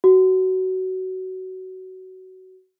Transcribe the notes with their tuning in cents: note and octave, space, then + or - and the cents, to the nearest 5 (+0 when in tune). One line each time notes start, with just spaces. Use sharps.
F#4 +20